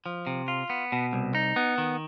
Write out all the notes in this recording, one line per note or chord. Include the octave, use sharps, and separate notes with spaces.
F3
C3
F4
B3
B2
C2
D#4
B3
D#3